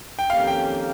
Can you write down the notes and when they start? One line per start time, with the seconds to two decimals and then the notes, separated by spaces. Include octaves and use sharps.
0.19 G5
0.30 F2 D#3 A#3 C#4 G4 F5
0.47 G5